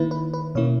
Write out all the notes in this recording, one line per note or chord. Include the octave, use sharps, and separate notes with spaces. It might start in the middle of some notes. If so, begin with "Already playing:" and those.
Already playing: D#3 A#3 E4 B4
B4
B4
B2 A#3 C#4 E4 C#5